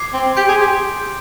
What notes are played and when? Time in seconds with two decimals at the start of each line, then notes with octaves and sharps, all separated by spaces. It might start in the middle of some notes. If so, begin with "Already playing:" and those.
Already playing: D6 G#6 C7
0.13 C4
0.37 G4 C6 G6 D7
0.48 G#4
0.61 G4